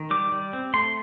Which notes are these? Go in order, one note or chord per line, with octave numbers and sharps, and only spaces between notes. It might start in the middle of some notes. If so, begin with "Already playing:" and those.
Already playing: D#3
G3 D6
G3
C4
A3 C6